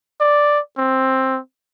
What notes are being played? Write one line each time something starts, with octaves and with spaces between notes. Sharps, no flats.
D5
C4